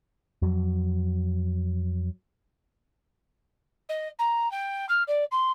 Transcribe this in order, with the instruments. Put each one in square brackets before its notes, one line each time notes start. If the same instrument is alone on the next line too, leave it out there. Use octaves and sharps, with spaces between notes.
[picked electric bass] F2 F#3
[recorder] D#5
A#5
G5
F6
D5
C6